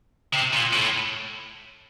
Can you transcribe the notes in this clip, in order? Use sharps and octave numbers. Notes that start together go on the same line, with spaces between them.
C3
A#2
A2